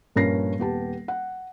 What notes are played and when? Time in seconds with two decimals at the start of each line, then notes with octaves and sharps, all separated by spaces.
0.16 A#1 G2 C#4 A#4 A#6 C7
0.58 D#1 B3 G4 A5
1.08 F#5